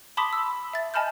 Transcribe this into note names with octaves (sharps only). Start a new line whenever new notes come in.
A5 B5 C6 D6 D#6 B6
E6
E5 A6
D#5 G#5 A5 B5 F6 G6